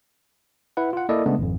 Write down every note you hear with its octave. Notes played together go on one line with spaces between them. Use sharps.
E4 B4 F#5
F4 F#5
A#3 E4 A4 D5 D#5
C#3 G#3 A3 B3 D4
G#1 F2